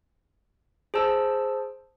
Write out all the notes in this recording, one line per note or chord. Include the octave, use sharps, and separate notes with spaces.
G#4 C5 A5 E6